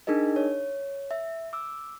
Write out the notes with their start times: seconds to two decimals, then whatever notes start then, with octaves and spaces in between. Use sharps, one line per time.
0.07 D4 D#4 G#4 A#4 D#5
0.36 C#5
1.11 E5
1.53 D6 E6